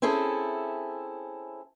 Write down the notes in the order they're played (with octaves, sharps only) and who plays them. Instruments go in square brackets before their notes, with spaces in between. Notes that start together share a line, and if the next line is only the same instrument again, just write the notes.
[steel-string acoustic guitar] C4 C#4 E4 G#4 A4